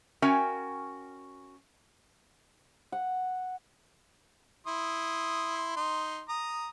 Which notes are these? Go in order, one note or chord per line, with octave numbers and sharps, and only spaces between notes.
C#4 F#4 A#4 E5 G5 G#5
F#5
E4 C6 D#6
D#4 C6
A#5 D#6